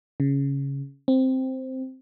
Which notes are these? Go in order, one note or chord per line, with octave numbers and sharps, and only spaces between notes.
C#3
C4